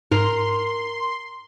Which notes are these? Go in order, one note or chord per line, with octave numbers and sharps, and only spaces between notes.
G#2 A#4 C6